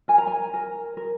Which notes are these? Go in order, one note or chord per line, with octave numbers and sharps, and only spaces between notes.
A#4 G#5
A#5
G#5
A#4
A#4